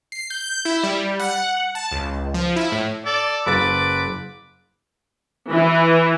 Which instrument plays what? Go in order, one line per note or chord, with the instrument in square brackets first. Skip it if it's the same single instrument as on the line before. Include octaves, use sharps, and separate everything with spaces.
[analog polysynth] C7
G6
E4
G3
F#5
A5
C#2
F3
E4
A2
[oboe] A4 [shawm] D5
[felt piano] F#1 A6 [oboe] B4 [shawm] D6
[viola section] E3